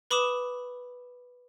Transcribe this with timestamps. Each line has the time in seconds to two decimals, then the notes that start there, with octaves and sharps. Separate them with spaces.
0.11 B4 B5 D6 D#6 E7